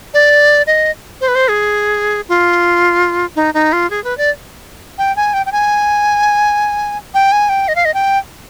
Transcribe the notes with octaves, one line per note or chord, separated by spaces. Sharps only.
D5
D#5
C5
B4
C5
G#4
F4
D#4
D#4
F4
G#4
B4
D5
G5
G#5
G5
G5
G#5
G5
G#5
G5
D#5
F5
D#5
G5